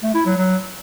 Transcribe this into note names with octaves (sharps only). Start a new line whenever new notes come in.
A3
E4
F#3
F#3